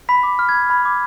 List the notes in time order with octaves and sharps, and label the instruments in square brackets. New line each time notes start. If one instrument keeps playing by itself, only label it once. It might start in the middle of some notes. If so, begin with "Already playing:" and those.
[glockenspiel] B5 B6
D6
F6
G#6
B5
B5
D6